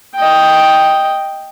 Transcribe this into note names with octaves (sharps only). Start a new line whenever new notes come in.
D#5 G5